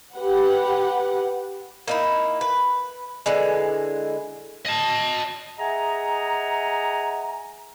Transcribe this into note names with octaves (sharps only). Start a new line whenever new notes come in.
G4 B4 F#5
A#3 D#4 E4
B4
D3 E3 G#3
D#5 A5
G#4 D#5 E5 F#5 G#5 A#5